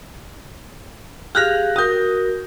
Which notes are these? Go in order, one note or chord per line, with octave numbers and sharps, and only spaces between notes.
G4 G#4 F5 F6 F#6 A#6
F#4 A#4 D#6 G6